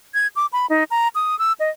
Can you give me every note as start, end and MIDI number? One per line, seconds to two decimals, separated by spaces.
0.14 0.27 92
0.36 0.46 86
0.53 0.66 83
0.70 0.84 63
0.91 1.08 82
1.15 1.38 87
1.39 1.53 88
1.60 1.70 75